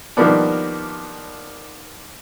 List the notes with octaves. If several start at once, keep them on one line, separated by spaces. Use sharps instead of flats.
D#3 F3 G3 A#3 B3 D4